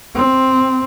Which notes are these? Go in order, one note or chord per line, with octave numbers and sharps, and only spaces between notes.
C4